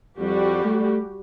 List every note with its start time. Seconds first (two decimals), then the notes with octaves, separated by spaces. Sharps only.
0.18 F2 G3 F#4 G4
0.64 A3